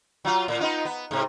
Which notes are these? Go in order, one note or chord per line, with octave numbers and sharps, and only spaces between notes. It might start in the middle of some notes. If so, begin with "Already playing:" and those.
F#3 F4
A2
B3 D#4 F4
B3
G#2 C3